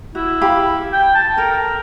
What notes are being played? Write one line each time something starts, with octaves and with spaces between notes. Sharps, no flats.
E4 F#4
G4 F5 B5
G5
A5
A4 A#4 G5